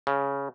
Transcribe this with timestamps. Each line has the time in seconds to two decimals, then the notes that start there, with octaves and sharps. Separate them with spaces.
0.07 C#3